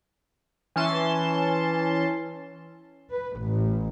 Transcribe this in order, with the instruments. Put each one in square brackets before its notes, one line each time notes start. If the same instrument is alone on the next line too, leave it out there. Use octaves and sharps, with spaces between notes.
[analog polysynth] E3 C#4 A5 C6
[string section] B4
A1